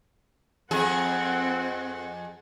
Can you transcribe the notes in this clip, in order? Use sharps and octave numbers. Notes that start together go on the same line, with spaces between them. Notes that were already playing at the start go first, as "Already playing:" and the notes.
F2 C4 G#4 F#5